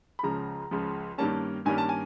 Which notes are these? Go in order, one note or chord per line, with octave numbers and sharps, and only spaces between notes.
B5
C#2 C#3 F3 A#5
C#2 C#3 F3
G2 D#3 G3 A#3 C#4 A5
G2 D#3 G3 A#3 C#4 G#5
A5
G#5